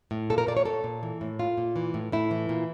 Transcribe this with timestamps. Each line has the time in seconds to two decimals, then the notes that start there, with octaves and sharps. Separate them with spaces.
0.11 A2
0.30 A#2 A4
0.38 A#4
0.47 A#2 D5
0.57 C#5
0.65 A#2 A4
0.84 A#2
1.03 E3
1.21 A2
1.39 A#2 F4
1.58 A#2
1.76 E3
1.94 A2
2.12 A2 E4
2.31 E3
2.49 A#2